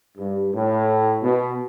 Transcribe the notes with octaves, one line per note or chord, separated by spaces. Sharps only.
G2
A2
B2